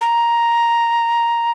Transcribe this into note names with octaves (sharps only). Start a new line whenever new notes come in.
A#5